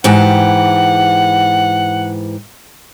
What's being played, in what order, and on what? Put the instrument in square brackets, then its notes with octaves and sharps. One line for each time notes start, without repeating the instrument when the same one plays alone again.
[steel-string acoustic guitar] G#2 E3 G4 [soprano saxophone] F#5